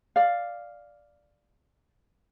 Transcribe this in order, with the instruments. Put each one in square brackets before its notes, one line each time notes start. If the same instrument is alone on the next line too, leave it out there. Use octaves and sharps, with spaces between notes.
[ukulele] D5 F5